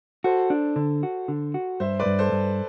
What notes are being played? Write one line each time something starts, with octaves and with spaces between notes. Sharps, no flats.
F#4 A4 C5
D4
D3
F#4
D3
F#4
G2 C5 E5
B4 D5
G2
A4 C5
G2